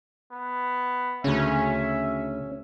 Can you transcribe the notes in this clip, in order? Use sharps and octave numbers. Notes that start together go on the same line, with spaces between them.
B3
D2 C#3 C#4 E5